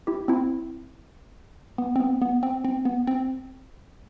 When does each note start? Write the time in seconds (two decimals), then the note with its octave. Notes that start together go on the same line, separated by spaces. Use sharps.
0.07 E4 G4
0.28 C4 E4
1.78 B3
1.96 C4
2.00 B3
2.22 B3
2.43 C4
2.64 C4
2.85 B3
3.07 C4